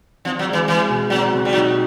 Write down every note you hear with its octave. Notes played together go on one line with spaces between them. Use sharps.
F3 C4
F#3
G#3
E3
E3 G#3
B2
F#3 C4
B2
G3
F#3 D#4